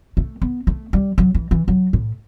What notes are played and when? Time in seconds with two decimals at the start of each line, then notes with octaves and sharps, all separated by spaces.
0.17 A3
0.42 B3
0.67 A3
0.93 G3
1.18 F#3
1.35 E3
1.51 E3
1.68 F#3
1.93 A2